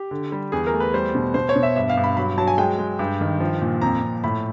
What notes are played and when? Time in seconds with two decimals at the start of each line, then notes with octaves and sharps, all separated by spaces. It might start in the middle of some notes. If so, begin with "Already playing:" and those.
Already playing: G4
0.11 D3
0.32 G3
0.52 E2 G#4
0.67 A#4
0.73 A3
0.80 B4
0.94 G3 C5
1.15 B2
1.34 B2 C5
1.49 C#5
1.56 B2
1.63 E5
1.76 G2 E5
1.90 F5
1.97 G2
2.04 B5
2.17 F#3 B5
2.37 F#3 A5
2.48 G#5
2.58 G#3 G5
2.78 G#3
2.99 G2
3.21 D#3
3.40 F3
3.62 A#2
3.81 F2 A#5
4.02 F2
4.24 A2 B5